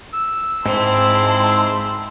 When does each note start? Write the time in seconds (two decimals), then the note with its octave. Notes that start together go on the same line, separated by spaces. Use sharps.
0.13 E6
0.65 G#2 C4 E4 A5 C6